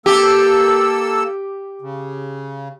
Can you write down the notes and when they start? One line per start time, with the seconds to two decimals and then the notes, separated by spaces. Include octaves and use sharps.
0.06 A#3 G4 A4 E6
1.82 C#3